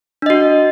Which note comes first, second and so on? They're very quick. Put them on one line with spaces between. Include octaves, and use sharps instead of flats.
D4 D#5 F#4